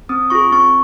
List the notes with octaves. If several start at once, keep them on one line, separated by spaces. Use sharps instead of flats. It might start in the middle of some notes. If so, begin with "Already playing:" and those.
C4 D#6
F4 G#4 C#6
C4 C#6